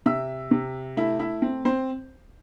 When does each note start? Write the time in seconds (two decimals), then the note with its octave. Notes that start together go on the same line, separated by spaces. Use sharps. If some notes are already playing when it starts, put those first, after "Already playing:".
0.06 C3 E5 E6
0.51 C3
0.97 A3 E4 E5
1.19 E4 E5
1.42 C4
1.65 C4 C5